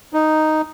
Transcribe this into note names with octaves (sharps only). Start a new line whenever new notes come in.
D#4